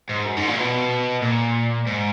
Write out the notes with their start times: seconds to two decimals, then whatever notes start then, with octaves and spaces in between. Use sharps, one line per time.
0.09 G#2
0.25 F#2
0.37 G#2
0.48 A#2
0.58 B2
1.22 A#2
1.87 G#2